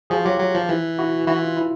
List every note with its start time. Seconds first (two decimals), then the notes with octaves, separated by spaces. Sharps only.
0.10 F3 F#4 G#4
0.25 F#3 F4 G4
0.39 F#3
0.55 F3
0.69 E3
0.99 E4 F#4
1.27 E3 E4 F#4
1.42 F4
1.57 E4